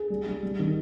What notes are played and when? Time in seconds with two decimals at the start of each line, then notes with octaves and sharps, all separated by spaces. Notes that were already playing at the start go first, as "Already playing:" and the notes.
Already playing: G#4
0.10 G3
0.26 G3
0.43 G3
0.59 D#3